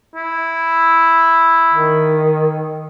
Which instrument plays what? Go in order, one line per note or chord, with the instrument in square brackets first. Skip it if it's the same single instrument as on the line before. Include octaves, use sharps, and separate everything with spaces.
[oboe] E4
[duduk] D#3